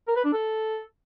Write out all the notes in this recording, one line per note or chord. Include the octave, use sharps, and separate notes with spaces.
A#4
B4
D4
A4